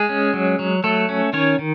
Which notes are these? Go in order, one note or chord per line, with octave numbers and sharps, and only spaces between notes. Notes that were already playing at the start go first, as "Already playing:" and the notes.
Already playing: G#3 G#4
C#4
F#3
F#3
F#3 A3 A4
C#4
D#3 C#4 C#5
D#3